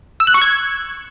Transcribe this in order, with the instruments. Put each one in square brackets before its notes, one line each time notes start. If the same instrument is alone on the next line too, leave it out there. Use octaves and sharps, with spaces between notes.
[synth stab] E6
F#6
C#6
G#6